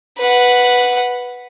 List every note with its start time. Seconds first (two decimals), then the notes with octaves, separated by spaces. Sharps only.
0.19 B4 F#5